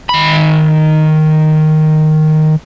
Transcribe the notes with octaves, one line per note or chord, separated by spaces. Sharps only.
D#3 B5